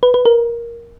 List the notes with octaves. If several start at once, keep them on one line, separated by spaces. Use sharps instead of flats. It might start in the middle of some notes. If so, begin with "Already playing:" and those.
B4
B4
A#4